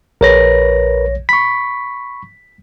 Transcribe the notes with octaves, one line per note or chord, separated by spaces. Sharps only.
A#1 A#4 B4 C#5 A#6
B5 C#6 B6